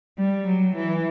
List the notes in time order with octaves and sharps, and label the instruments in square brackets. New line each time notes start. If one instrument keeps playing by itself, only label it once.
[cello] G3
F#3
E3